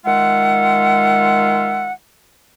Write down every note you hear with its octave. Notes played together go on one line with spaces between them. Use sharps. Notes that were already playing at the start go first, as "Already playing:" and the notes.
D#3 G#3 F4 E5 F#5